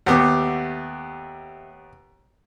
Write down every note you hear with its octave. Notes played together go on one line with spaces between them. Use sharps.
D#2 A3 B3 G4 F#5